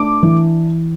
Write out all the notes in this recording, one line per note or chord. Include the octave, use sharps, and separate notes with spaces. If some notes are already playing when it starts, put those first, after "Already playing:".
Already playing: A3 D4 D6
E3